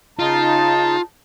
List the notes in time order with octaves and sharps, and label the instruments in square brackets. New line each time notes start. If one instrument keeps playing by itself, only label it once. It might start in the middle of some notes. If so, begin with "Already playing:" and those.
[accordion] C#3 D#4 [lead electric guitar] F4 [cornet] A5